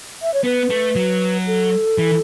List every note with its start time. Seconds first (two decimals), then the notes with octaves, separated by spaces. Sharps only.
0.22 E5
0.34 C#5
0.44 B3 B4
0.70 A3
0.96 F#3
1.47 A4
1.98 E3